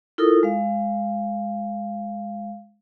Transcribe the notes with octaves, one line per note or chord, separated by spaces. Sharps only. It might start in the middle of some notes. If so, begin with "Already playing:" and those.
E4 F4 A4 A#4 D#6
G#3 F5